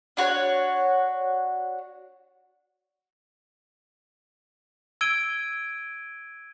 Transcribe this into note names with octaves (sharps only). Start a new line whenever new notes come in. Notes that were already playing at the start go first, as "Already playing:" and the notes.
D4 F#4 C#5
E6 G#6 D7 D#7 G7